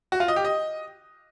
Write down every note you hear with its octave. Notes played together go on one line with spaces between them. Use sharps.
F#4
F4
D#5
G4
D#5